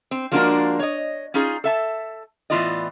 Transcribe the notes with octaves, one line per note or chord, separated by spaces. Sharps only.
C4
F3 G#3 A#3 D4 F#4 A#4
C#5 D#5
C#4 D#4 F4 G#4
A4 E5 A5
A2 E3 B3 F4 D5 D#5